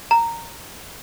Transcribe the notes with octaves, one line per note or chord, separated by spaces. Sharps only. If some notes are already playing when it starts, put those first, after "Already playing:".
A#5